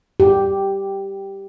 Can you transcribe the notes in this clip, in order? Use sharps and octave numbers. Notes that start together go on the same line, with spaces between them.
G4